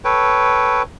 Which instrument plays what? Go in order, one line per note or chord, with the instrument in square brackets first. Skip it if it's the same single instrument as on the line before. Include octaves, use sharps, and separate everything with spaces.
[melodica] A4 B4 C#5 G5